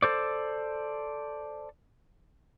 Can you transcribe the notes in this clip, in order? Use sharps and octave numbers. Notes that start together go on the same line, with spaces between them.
A4 C5 D5